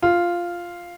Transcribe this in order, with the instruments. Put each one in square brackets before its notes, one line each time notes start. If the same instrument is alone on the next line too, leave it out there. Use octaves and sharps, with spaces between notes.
[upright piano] F4